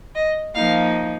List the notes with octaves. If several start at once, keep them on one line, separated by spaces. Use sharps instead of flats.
D#5
F3 A#3 D#4 F5